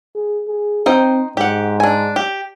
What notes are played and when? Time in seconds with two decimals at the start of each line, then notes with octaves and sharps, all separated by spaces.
0.16 G#4
0.48 G#4
0.86 C4 D#4 C5 G5
1.37 G#2 G4 F#5
1.80 D4 G#5
2.16 G4